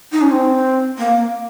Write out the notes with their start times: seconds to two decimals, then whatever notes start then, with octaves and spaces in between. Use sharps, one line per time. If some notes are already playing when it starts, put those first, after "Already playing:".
0.12 D#4
0.21 C#4
0.31 C4
0.98 A#3